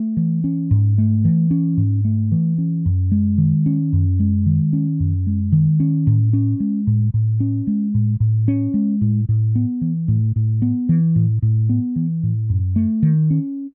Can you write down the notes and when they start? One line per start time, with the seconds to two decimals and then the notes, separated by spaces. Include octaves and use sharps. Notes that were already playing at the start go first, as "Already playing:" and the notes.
Already playing: A3
0.17 E3
0.44 C#4
0.71 G#2
0.98 A3
1.25 E3
1.51 C#4
1.77 G#2
2.05 A3
2.32 E3
2.58 C#4
2.86 F#2
3.12 G#3
3.38 D#3
3.66 C#4
3.93 F#2
4.20 G#3
4.46 D#3
4.73 C#4
5.00 F#2
5.27 G#3
5.52 D#3
5.80 C#4
6.07 A2
6.33 C#4
6.60 G#3
6.87 A2
7.14 A2
7.40 C#4
7.67 G#3
7.94 A2
8.20 A2
8.48 C#4
8.74 G#3
9.01 A2
9.29 A2
9.55 B3
9.81 E3
10.08 A2
10.36 A2
10.62 B3
10.89 E3
11.16 A2
11.42 A2
11.69 B3
11.96 E3
12.23 A2
12.50 F#2
12.76 A3
13.03 D#3
13.31 C#4